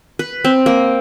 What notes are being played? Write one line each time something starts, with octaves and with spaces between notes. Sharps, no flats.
B4
C4
A#3